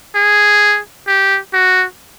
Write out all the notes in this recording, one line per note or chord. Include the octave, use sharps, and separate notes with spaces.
G#4
G4
F#4